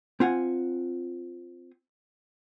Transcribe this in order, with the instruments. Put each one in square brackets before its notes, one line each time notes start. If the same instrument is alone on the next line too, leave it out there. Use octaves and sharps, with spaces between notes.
[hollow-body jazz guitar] C4 F4 F#5 G#5